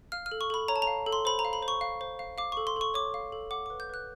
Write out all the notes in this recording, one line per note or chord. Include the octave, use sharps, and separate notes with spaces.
F5 F6
F6
A4
C#6
A4 B5
C#5 A#5
A5
A#5
F5
A4
C6
C5 B5
A#5
F5
B5
C5
C#6
F5
C5
F5
F5 D6
A4 C#6
C6
A4 C#6
C#5 D6
F5
A4
F#5 D6
B4 D6
G6
B4 F#6